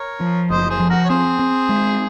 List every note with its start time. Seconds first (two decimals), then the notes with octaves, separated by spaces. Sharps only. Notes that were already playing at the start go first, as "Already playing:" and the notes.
Already playing: A#4 C#5
0.20 F3
0.50 F#1 C5 D#5
0.70 G#4 C5
0.80 F3
0.90 F#4 A#4
1.04 C#5
1.09 C4 G#4 C5
1.39 C4
1.69 G#3